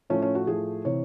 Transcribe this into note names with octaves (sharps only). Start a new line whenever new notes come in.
A2 F3 A3 C#4
C#4
F#4
A2 F3 A3 G#4
C3 E3 C#5